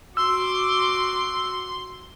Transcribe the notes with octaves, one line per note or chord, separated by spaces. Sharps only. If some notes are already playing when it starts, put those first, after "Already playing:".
F#4 C6 D6 E6